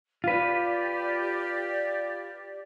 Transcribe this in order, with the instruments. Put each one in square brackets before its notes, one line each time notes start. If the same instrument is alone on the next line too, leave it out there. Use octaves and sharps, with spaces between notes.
[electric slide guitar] F4 B4 [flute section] G4 D5